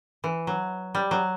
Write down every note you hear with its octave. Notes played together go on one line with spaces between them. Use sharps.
E3
F#3
G3
F#3